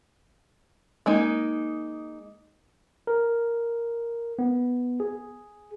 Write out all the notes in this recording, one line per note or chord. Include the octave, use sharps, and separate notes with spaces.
G#3 A#3 D#4
A#4
B3
G#4